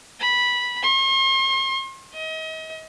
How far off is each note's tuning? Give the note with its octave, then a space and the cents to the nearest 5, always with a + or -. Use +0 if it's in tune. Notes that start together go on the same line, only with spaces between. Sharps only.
B5 -10
C6 +45
D#5 +35